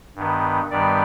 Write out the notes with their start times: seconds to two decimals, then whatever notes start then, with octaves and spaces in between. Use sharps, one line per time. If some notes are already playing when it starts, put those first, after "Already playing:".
0.15 G2 D#3 B3
0.70 G2 D#3 G3 B3 D5